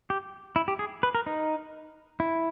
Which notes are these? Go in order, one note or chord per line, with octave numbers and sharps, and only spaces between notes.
G4
E4
G4
G#4
B4
A#4
D#4
E4